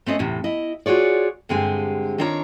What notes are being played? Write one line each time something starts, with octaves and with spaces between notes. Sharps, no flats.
A3 C4 C#4 D#5
E2 A2 C3
E4 D#5
F4 F#4 G#4 C#5 D5
G2 D3 G#3 C4 G4 G#5
D#3 C4 D4 F4 C#5 A#5